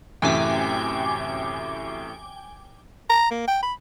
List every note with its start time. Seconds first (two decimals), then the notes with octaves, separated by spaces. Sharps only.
0.22 F#2 A2 C3 E3 E5 G5 G#5 D6
3.10 A#5
3.31 A#3
3.48 G5
3.63 B5